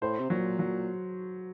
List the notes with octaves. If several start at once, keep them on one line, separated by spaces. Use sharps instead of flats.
A2 C5
C3
A#2 F#3
F#3